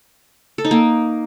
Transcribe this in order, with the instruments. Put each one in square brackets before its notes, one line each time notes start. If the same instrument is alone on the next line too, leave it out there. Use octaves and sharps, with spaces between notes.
[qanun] A4
D#4
A#3